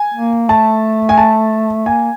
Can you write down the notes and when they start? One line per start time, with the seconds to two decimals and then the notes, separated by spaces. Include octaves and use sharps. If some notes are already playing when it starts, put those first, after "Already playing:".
Already playing: G#5
0.14 A#3
0.48 A3 A5
1.09 G#5
1.18 A5
1.86 A#3 G#5